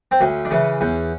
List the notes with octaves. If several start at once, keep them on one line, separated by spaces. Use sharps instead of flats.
C4
D2 C#4
D4
C#3 E3 C#4
E2 C#4